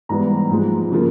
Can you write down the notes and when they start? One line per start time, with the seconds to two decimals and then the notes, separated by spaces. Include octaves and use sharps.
0.09 G#2 E3 G3 B3 A#5
0.50 G#2 F3 G#3
0.91 C#3 F3 A#3